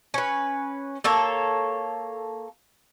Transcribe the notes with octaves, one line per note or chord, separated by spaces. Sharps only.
C#4 B4
A#3 A4 C#5